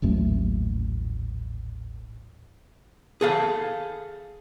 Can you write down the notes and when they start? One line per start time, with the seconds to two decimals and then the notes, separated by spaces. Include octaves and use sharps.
0.02 D#1 A1 F#2 A3
3.21 G#4 A4 F5